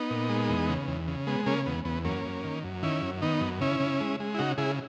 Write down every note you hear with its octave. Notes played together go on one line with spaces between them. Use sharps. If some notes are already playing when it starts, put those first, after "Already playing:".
Already playing: B3 D#4
A#2
G#3
E2
C#3
E2
C#3
G#3 B3
C#3 A#3 C#4
E2 B3
E2 B3
F#2 A#3 C#4
F#2
D#3
F#2
D#3 C#4 E4
F#2
D#3 B3 D#4
F#2
C#3 C#4 E4
C#3
G#3
G#3
E4
C#3 D#4 F#4
C#3 E4 G#4